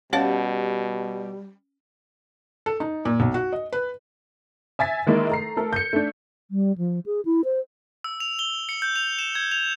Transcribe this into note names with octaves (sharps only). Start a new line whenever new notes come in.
B2 G3 C#4 G4 C#5 F5 F#5 A5
A4
D#4
A#2
B1
F#4
D#5
B4
E5 G#5 A6 B6
D#3 G#3 A#3 E4 A#4
A3 A#5 C7
A3 A4 A#4
G6 C#7
A3 D4
G3
F3
G#4
E4
C5
E6
F7
G7
C#7
G6
F7
E7
G#6
F7